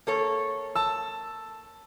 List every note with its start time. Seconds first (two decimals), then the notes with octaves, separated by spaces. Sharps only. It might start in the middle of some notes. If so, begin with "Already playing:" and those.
0.07 A#3 A4 C#5
0.75 A5 E6